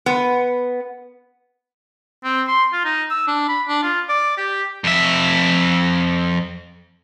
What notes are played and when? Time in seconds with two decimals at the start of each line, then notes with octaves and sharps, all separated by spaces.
0.06 B3
2.24 C4
2.48 C6
2.73 F4
2.85 D#4
3.11 E6
3.27 D4
3.49 B5
3.68 D4
3.83 F4
4.09 D5
4.37 G4
4.84 F2 E5